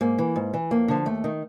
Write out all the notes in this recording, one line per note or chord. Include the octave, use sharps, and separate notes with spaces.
G#2 A#3
E3
G#2
E3
F2 A#3
D3 F3
D#2 A3
D#3